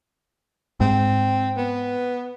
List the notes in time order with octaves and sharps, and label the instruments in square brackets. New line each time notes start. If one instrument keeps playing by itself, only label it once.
[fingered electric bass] G#2 [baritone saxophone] C4
[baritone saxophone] B3